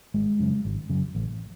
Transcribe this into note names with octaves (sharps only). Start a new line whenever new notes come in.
G#1 G#3
F#2 C#3
G#1
F#2 C#3
A1